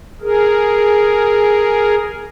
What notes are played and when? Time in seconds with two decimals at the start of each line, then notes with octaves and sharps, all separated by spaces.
0.21 G#4 A#4